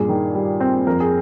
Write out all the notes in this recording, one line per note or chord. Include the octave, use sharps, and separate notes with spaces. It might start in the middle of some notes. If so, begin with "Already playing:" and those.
Already playing: G2 A#2 G#4
D#3
G3
C4
F2 A#4
G#4